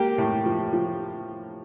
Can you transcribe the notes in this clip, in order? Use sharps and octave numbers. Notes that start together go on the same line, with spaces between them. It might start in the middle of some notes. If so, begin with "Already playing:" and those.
Already playing: A#3 G4
A2
F3
F3